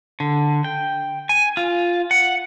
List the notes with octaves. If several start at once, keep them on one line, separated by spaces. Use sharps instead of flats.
D3
G5
G#5
F4
F#5